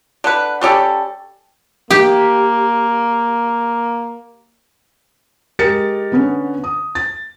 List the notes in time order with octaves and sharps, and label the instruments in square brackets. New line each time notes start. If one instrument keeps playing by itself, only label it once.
[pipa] D3 B4
G3 C#4 G4 A4
[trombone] A#3 [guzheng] G4
[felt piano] G#3 G4 A#4 A6 C#7
D3 B3 C#4
D#6
A6